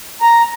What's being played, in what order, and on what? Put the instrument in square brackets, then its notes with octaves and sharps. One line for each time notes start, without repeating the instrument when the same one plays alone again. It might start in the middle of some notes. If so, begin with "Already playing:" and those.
[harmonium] A#5